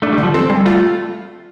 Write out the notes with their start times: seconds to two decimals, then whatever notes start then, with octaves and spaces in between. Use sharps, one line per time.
0.02 A3 D4
0.12 G3
0.18 D3
0.23 F3
0.34 C4 A4
0.50 G3
0.66 A3 F4